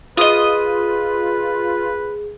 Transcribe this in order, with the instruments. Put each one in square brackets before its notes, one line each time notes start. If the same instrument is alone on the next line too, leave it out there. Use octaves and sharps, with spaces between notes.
[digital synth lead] F4 [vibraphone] G#4 [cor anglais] B4 [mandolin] D#5 D#6